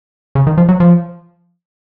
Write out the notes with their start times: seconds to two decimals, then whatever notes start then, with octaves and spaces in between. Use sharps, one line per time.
0.35 C#3
0.47 D#3
0.58 F3
0.69 F#3
0.80 F3